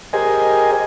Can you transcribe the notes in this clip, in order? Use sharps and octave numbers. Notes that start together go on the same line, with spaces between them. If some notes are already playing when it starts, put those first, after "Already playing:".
G4 G#4 A#4 C5 D#5 G#5